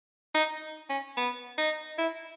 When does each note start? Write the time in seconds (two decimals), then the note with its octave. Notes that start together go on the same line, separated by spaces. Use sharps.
0.35 D#4
0.90 C#4
1.17 B3
1.58 D#4
1.99 E4